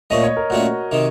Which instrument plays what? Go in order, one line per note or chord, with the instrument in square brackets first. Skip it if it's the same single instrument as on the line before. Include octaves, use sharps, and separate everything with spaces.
[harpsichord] A#2 A3 C#4 [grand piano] D#5
[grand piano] C#5
A#4
[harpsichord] A#2 A3 C#4 [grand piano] F#4
[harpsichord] C3 D#3